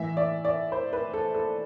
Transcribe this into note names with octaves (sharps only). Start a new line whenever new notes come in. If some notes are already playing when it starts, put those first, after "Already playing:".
Already playing: A2 E3 E5
D5
D5
C5
B4
A4
A4